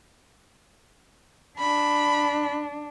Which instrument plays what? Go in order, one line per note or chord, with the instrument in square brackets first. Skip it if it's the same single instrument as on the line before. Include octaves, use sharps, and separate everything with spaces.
[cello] D4 [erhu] B5